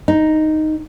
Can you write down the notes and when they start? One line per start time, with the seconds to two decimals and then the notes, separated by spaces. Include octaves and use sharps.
0.08 D#4